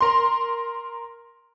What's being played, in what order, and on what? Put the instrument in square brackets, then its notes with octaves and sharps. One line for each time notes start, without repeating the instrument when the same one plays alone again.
[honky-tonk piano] A#4 C6